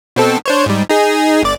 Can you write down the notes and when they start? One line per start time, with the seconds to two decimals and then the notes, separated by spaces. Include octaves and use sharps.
0.16 B2 C4 A4
0.46 D4 C5 C#5
0.66 G#2 G3
0.89 D#4 G#4
1.43 G1 D5